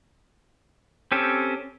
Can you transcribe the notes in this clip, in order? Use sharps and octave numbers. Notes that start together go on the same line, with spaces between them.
C4 C#4 G4 A4